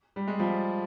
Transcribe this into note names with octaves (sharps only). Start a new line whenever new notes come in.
G3
G#3
F3 G3